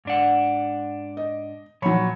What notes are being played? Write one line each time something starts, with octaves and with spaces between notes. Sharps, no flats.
G#2 D4 F#5
D#5
A#2 F3 F#3 C#5 B5